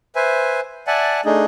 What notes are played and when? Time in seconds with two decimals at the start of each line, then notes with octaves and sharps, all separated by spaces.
0.16 B4 C5 E5 G#5
0.87 D5 E5 F#5 G#5 A5
1.25 A3 D4 D#4 G#4 D#5